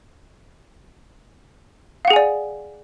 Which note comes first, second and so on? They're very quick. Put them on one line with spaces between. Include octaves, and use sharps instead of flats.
F5 F#5 G#4 G#5 D5